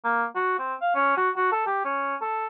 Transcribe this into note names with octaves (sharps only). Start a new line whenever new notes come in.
A#3
F#4
C4
F5
C#4
F#4
F#4
A4
G4
C#4
A4